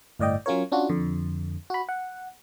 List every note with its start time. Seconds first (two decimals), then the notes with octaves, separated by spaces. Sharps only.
0.19 G1 A2 D5 D#5 G5
0.46 F#3 C#4 F4 A#4 C#5
0.72 C#4 D4 F4 F#4
0.89 F2 D3
1.70 F#4 B5
1.89 F#5